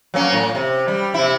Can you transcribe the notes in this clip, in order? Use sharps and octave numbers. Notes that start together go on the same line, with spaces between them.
F#3 A#3 C#4
A2
C3
G3
C3 E4